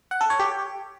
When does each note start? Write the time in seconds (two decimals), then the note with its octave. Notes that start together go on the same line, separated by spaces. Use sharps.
0.11 F#5
0.21 A4
0.30 C#5
0.39 G4